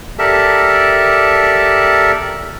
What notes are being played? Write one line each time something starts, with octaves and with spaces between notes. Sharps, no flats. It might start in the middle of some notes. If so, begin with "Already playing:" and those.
G4 A4 A#4 D5 E5 A5